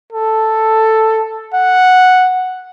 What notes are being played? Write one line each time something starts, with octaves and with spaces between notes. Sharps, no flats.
A4
F#5